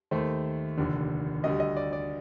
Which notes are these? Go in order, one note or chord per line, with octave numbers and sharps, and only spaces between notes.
D#2 D#3 A3 C5
F1 D#2 D3
D2 D3 G3 D#5
D#5
D5
D5